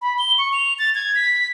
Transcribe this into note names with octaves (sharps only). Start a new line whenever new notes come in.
B5
G7
C#6
F7
A6
G#6
B6